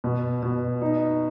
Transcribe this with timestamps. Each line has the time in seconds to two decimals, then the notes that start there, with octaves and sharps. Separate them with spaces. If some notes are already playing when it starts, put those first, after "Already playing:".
0.04 B2
0.43 B2
0.82 D#4